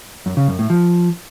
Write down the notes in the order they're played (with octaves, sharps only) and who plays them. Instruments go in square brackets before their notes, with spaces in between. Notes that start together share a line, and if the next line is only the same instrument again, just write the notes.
[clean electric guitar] F#2
C#3
F#2
A2
F3